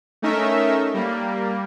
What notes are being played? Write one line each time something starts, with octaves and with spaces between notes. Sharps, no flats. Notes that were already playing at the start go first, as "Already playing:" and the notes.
A3 C#4 D#4 A#4 E5
G3 A#3